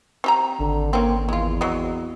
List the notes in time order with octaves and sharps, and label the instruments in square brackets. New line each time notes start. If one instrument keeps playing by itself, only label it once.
[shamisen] C4 G4 A#5
[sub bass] G#1 [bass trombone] D3
[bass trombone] A#3 [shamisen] C4 C#4
[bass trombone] E2 [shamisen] G#3 F4
[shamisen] F#3 C4 D#5